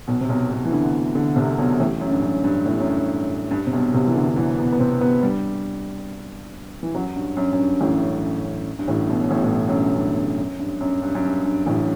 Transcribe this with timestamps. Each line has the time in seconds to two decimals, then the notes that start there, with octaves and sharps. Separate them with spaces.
0.07 B1 B2
0.21 C3
0.29 B1 B2
0.50 B1 B2
0.65 E3
0.72 D2 D3
1.15 D2 D3
1.36 C2 C3
1.58 B1 B2
1.80 A1 A2
2.01 F#2
2.11 G2
2.22 F#2
2.44 G2
2.66 A2
2.73 G2
2.80 F#2
2.87 G2
3.51 G2
3.67 C3
3.73 B1 B2
3.94 C2 C3
4.07 E3
4.15 D2 D3
4.28 D3
4.36 E2 E3
4.58 B2 B3
4.72 B3
4.80 C3 C4
5.01 B2 B3
5.22 G2 G3
6.83 E3
6.94 F#2 F#3
7.16 G2
7.37 F#2
7.53 F#2
7.59 G2
7.80 A1 A2
8.79 G2
8.88 A1 A2
9.09 B1 B2
9.31 A1 A2
9.43 A2
9.52 B1 B2
9.69 F#2
9.73 G2
9.95 G2
10.17 G2
10.38 F#2
10.59 G2
10.81 F#2
11.02 G2
11.15 F#2
11.24 G2
11.45 G2
11.66 A1 A2